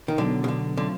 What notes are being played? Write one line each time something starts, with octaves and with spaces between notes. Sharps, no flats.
D#3
B2 D3 F#3 B3
C#3
D3
D3 F#3 A3 C4 F4